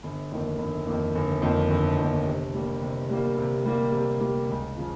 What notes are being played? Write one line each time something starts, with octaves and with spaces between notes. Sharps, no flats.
G1
F2 D#3 A#3
G1
F2 D#3 A#3
G1
F2 D#3 A#3
G1
F2 D#3 A#3
C3
G3 A#3
C3
G3 A#3
C3
G3 A#3
C3
G3 A#3
C#2
C#3 F3